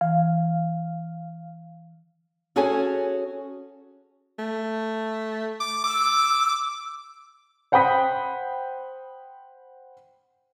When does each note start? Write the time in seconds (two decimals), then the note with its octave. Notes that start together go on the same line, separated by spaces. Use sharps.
0.01 E3 F5
2.56 C#4 F#4 G#4 A4 C#5 G#5
4.39 A3
5.61 D6
5.84 D6 E6
7.72 C5 F#5 G5 B5 D#6 B6